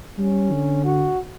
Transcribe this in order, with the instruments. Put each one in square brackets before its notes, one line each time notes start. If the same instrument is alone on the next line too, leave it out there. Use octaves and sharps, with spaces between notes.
[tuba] G3 [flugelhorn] C#4
[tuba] D3
[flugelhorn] F#4